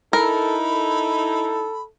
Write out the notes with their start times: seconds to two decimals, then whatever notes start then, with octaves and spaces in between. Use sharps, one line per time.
0.13 D#4 E4 A4 A#4 B5
0.70 A4